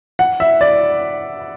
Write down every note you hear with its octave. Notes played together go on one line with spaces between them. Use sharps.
F#5
E5
D5